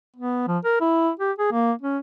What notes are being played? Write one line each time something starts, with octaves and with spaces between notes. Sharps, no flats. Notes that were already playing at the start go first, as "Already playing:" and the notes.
B3
F3
A#4
E4
G4
G#4
A#3
C#4